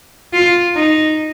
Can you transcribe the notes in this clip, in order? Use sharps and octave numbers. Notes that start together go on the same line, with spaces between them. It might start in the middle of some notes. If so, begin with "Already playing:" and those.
F4
D#4